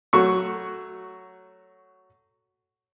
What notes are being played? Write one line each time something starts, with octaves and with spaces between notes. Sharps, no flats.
F#3 A3 F#4 C#6